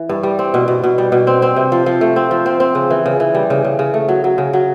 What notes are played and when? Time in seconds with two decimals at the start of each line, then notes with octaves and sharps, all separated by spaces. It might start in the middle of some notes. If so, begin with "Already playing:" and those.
Already playing: E3
0.09 G2
0.23 G3
0.39 C4
0.54 B2
0.68 B2
0.83 B2
0.98 G3
1.12 B2
1.27 C4
1.42 C4
1.56 C3
1.72 F3
1.86 F3
2.01 A3
2.16 C4
2.31 F3
2.46 C4
2.60 C4
2.75 C#3
2.90 E3
3.06 C#3
3.20 E3
3.35 G3
3.50 C#3
3.64 C#3
3.79 C#3
3.94 A3
4.08 F#3
4.24 F#3
4.38 C#3
4.53 F#3